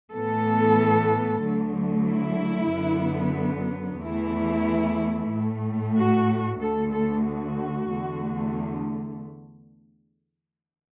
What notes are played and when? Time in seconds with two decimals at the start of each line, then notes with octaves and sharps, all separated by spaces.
0.12 A2 E3 B3 A4
1.41 D2 D3 F#3 A3
2.07 E4
2.72 F#2 D3 F#3 B3
4.01 E2 E3 A3 E4
5.32 A2 A3
5.96 F#4
6.61 D2 D3 A3 A4
6.94 A4
7.27 F#4
7.91 E2 D3 A3